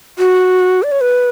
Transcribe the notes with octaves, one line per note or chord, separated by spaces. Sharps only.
F#4
D5
C#5
B4